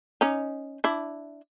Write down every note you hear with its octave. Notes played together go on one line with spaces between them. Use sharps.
C#4 D#4
D4 E4